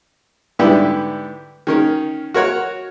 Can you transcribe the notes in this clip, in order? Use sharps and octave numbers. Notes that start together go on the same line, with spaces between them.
G#2 D3 G3 B3 E4 G4
D#3 C#4 A#4
F#4 A#4 C#5 F#5